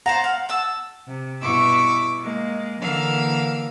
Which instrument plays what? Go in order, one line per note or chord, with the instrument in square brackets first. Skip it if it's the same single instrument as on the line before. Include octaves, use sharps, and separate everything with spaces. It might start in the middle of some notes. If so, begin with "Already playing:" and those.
[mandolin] C5 A5 A#5 [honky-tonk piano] F#5
[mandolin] F5
A5 E6
[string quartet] C3
G2 B2 E4 C#6 D6 E6
G#3 A#3
D3 E3 A#3 A#4 F5 E6